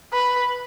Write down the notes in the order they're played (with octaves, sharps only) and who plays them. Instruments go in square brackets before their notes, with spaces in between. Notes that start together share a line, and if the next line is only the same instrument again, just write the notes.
[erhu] B4